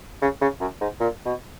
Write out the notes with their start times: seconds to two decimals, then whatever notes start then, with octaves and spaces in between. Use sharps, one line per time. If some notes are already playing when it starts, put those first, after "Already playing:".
0.22 C#3
0.41 C#3
0.61 F#2
0.81 G#2
1.00 A#2
1.26 B2